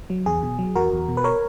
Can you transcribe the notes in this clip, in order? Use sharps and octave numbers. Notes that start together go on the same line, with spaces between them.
F#3
E2 G#4
B2
F#3
E2 F#4 A#4
E2
B2
B4
A#4 C#5